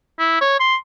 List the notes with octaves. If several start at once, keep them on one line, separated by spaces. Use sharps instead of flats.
E4
C#5
C6